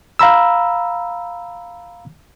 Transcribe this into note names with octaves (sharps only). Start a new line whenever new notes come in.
F5 A#5 B5 E6